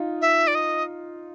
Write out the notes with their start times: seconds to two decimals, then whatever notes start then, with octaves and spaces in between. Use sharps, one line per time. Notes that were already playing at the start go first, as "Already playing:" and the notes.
Already playing: D#4 F4
0.21 E5
0.47 D5
0.55 D#5